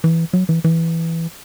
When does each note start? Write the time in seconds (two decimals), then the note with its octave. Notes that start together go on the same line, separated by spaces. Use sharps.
0.04 E3
0.33 F#3
0.49 E3
0.64 E3